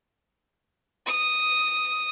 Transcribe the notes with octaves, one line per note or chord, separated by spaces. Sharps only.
D#6